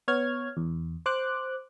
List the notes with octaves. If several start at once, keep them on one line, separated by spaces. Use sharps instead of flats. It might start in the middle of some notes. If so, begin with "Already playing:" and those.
B3 C#5 F6 G#6
E2
C5 D6 F#6